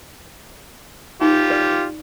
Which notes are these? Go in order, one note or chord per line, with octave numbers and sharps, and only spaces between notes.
D#4 F4 G4
B4 D5